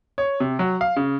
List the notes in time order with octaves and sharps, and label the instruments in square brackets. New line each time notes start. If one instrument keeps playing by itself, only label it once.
[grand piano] C#5
C3
F#3
F5
C#3